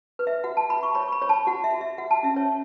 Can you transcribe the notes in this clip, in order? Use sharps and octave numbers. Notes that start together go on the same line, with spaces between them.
B4
E5
F#4 F#5
A5
F#4 B5
C#6
C#5 B5
C#6
B5
C#5
A5
F#4 F#5
E5
F#4
E5
F#4 F#5
A5
C#4 E5
C#5